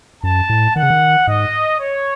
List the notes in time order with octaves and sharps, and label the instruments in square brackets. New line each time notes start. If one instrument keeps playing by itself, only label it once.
[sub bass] F#2 [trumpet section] A5
[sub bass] A2
[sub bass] D#3 [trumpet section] F#5
[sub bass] C#3
D#3
[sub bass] G#2 [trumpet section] D#5
[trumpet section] C#5